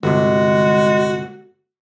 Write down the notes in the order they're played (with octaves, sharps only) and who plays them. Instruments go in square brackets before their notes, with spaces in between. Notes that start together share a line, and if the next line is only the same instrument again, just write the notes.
[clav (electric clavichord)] G1 C3 [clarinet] G#3 [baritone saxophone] F#4